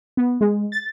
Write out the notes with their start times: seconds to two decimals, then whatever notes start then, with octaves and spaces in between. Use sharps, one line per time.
0.17 B3
0.41 G#3
0.72 A6